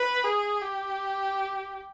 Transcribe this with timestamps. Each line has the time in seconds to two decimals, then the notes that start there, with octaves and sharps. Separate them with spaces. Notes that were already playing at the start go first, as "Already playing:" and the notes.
Already playing: B4
0.24 G#4
0.61 G4